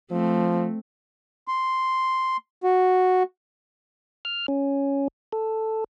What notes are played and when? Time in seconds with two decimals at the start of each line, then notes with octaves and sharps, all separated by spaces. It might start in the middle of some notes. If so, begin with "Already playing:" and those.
0.11 F3 A3 C4
1.48 C6
2.64 F#4
4.25 F6
4.48 C#4
5.33 A4